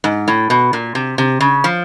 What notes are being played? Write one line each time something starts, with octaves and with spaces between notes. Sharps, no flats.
G#2
A2
B2
A#2
C3
C3
C#3
F3